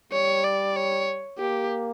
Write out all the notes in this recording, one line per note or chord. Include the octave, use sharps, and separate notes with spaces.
G3 C#5
D5
C#5
A#3 G4